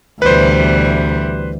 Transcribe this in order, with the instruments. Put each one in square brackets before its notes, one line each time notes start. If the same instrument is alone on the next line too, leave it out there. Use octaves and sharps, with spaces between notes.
[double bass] D2 [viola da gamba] B2 E3 G3 [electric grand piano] B4 C5